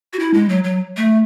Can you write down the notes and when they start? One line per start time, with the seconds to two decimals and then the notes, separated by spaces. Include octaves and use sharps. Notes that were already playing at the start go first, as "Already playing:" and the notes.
0.13 F#4
0.19 E4
0.34 G#3
0.49 F#3
0.64 F#3
0.97 A3